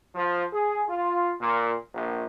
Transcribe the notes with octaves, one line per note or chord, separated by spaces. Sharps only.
F3
G#4
F4
A#2
A#1